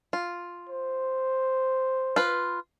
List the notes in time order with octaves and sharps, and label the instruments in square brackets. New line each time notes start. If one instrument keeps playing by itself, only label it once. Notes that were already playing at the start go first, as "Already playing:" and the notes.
[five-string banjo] F4
[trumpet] C5
[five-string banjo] F4 B4